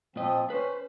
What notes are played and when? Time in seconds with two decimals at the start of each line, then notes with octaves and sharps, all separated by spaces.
0.16 A#2 F3 C4 D#5
0.50 C#4 B4 C5